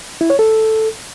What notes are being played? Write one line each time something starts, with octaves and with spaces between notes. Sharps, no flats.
E4
C#5
A4